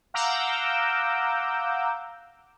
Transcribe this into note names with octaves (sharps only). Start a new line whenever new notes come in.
F5 F#5 A#5 D6 E6 G6